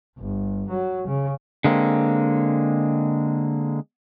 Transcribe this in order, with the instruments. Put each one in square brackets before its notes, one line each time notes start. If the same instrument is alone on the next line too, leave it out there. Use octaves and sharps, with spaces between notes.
[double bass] G1
F#3
C#3
[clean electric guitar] D3 G#3 A#3 C4